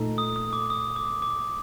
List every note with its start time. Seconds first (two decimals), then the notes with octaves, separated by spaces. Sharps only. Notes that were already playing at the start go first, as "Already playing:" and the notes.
Already playing: A#2 A3 D#4 A4
0.18 D#6
0.36 D#6
0.53 D6
0.70 D#6
0.96 D6
1.22 D6